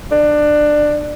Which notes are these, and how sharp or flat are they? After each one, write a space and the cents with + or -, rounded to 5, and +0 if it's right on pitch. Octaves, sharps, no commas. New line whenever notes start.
D4 +20